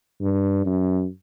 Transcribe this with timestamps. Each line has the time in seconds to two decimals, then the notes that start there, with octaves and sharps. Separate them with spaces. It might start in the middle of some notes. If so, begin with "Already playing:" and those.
0.21 G2
0.66 F#2